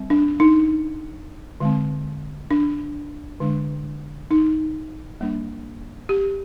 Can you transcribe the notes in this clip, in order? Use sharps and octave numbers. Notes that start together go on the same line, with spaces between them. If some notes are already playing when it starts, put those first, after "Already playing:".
Already playing: G3 C4
D4
D#4
D3 G#3 C4
D4
D3 G#3 D4
D#4
G3 A#3 D4
G4